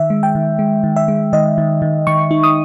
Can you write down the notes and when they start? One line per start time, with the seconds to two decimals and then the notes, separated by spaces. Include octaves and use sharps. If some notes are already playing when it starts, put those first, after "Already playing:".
Already playing: D#3 E5
0.10 G#3
0.23 G5
0.35 D#3
0.59 G#3
0.84 D#3
0.96 E5
1.08 G#3
1.33 D#3 D#5
1.58 D#3
1.82 D#3
2.07 D#3 C#6
2.31 D#4
2.43 D#6